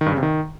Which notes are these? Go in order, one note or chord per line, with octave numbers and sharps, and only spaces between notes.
D#3
G2
C#3
C3
D#3